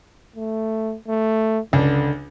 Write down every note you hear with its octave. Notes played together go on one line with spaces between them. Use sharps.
A3
A3
C#2 D3 D4